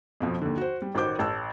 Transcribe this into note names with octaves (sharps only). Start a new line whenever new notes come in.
F2 B2 F3
D#2 D3
F#4 C5
G3
A1 D#3 F#4 C5 D6 G6
A1 A5 E6